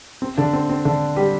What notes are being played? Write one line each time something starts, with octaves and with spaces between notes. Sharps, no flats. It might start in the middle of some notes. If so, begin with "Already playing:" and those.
C4
D3 D4
C4
C4
D3 D4
G3 G4